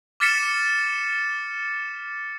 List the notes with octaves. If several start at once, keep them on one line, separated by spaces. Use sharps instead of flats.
D6 F6 A6 B6 C#7 E7